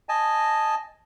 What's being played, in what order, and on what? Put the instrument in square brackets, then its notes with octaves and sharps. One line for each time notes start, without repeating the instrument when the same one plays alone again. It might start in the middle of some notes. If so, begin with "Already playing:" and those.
[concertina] D#5 G#5 A5